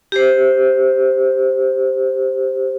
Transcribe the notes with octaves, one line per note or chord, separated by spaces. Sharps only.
G4 C5